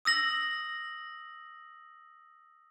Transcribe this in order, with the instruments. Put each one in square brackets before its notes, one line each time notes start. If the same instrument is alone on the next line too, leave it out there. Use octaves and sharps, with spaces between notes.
[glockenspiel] D#6 E6 A#6 F#7